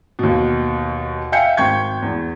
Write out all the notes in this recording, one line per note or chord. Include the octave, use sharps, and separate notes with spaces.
D#2 B2
E5 F5 G5 G#5 G6 C#7
G#1 G5 C#6 G6 G#6
E2